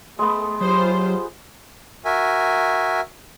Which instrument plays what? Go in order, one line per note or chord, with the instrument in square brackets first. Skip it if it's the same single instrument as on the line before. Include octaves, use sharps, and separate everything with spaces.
[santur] G#3 B3 [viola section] A3
[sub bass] F#3 [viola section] F4 G4 C5
[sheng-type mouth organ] F#4 A#4 E5 G#5